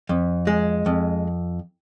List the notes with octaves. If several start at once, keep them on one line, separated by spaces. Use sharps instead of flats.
F2
G#3
F2